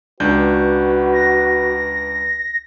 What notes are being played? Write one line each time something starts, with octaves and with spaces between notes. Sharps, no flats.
C#2 D4 F#4 B4 G6
A#6